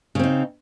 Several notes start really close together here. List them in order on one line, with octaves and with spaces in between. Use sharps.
C#3 C4 D#4